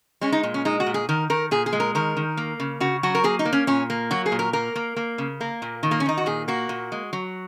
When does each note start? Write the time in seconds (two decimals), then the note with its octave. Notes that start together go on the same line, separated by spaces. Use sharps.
0.21 G#3 C#4
0.32 D#4
0.43 A#2
0.54 C#4
0.65 G#3 D#4
0.80 F#4
0.86 A#2
0.94 G#4
1.09 D#3 A#4
1.30 D#3 A#4
1.51 A#2 G#4
1.66 G#4
1.73 G#3
1.80 A#4
1.95 D#3 A#4
2.17 D#3
2.37 A#3
2.60 C#3
2.80 C#3 F#4
3.03 F#3 F#4
3.15 A#4
3.24 A#3 G#4
3.39 D#4
3.45 A#3
3.53 C#4
3.67 A#2 C#4
3.90 A#3
4.11 F#3 F#4
4.26 G#4
4.32 A#2
4.39 A#4
4.53 A#3 A#4
4.76 A#3
4.96 A#3
5.18 C#3
5.41 A#3
5.62 A#2
5.83 D#3
5.91 A#3
6.00 C#4
6.06 D#3 D#4
6.17 F#4
6.26 A#2 G#4
6.48 A#3 F#4
6.69 A#2
6.92 G#3
7.13 F#3